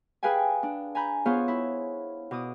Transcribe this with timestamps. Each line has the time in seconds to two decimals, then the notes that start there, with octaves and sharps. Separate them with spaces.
0.23 G#4 B4 F5 G5 G#5
0.63 D4
0.95 G#5 A#5 B5 G6
1.26 B3 F4 G#4 C5 C#5 F5
1.48 E4
2.31 B2 D6 D#6